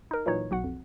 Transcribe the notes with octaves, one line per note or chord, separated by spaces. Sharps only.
D#4 A#4
A#2 E3 F#3 D#4 C#5
B1 F#4 F#5
F2